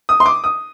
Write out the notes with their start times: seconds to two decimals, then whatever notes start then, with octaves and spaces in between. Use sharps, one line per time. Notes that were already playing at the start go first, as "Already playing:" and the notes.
0.09 D#6
0.20 C6
0.26 D6
0.44 D#6